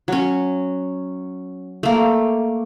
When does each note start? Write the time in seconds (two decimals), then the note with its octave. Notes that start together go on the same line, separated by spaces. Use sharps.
0.08 F#3 C#4
1.83 A3 A#3